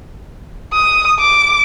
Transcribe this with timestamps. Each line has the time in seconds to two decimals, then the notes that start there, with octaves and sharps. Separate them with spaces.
0.73 D#6
1.20 D6